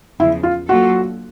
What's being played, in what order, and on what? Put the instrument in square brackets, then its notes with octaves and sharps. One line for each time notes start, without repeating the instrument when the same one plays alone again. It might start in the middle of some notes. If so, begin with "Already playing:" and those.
[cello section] E2 C#3 F3 [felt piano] E4
[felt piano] F4
[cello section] F#3 A#3 D4 F4 A4 [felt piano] F#4